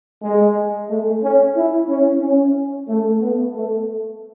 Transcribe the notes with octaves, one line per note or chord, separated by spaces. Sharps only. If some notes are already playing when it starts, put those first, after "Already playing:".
G#3
A3
C#4
E4
C#4
C#4
A3
B3
A3